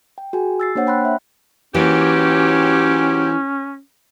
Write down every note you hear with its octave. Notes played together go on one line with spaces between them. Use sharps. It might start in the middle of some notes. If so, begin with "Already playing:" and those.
G5
F#4 G#4 G#5
E6 A6 C7
A#3 D4 C5 C#5 F#5
G5 B5 C6 F#6
E5
G#2 E3 F#3 A#3 C#4 G4